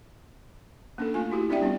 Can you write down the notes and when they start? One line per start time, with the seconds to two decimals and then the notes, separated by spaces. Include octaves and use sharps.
0.98 A#3 C#4 D4 A4
1.14 A3 F4 G#5
1.32 E4 F#4 G4
1.50 C4 D4 G4 D5 E5 G5
1.61 G3 B3 C#4 F4